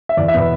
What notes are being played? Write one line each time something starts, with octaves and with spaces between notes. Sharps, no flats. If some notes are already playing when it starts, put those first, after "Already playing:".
E5
E2 D5
E5
B2 B3 B4